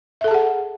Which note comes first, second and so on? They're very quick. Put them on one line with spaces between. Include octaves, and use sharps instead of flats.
E5 A4 A5 G#4 F#5